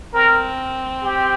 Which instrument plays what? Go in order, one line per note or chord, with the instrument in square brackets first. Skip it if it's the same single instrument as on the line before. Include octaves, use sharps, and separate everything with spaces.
[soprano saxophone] C4 [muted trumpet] A#4
[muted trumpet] G4